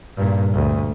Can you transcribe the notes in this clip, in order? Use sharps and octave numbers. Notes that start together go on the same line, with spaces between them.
G2 A#2
D2